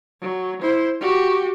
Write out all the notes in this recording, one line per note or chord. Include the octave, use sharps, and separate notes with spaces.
F#3
E4 C5
F#4 G4